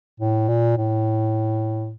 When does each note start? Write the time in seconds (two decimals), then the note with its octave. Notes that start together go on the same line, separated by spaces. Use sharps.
0.20 A2
0.48 A#2
0.77 A2